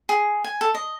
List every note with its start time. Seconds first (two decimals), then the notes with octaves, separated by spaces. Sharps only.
0.09 G#4
0.44 G#5
0.61 A4
0.75 D#5